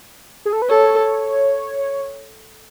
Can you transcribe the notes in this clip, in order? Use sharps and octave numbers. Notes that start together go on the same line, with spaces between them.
G#4
A4
B4
A4 C#5